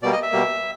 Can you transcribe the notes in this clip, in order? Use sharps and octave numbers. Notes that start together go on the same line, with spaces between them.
B2 G3 A#3 D5
D#5
E5
B2 G3 A#3